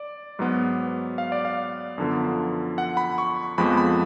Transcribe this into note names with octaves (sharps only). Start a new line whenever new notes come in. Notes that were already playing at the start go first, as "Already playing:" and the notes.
Already playing: D5
G#2 F#3 B3
F5
D5
F5
F#2 D3 F3 B3
F#5
B5
C#6
F2 F3 G#3 B3 B5
B5